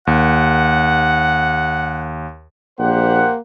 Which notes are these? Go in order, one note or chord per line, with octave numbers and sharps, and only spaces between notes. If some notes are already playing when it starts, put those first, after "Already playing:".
D#2 F#5
A#1 A#3 G4 C5 F#5